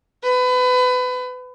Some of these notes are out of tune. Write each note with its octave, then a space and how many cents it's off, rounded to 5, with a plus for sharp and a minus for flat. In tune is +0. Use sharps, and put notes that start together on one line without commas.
B4 +25